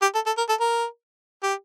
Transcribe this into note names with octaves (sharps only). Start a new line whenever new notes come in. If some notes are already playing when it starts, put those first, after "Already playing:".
G4
A4
A4
A#4
A4
A#4
G4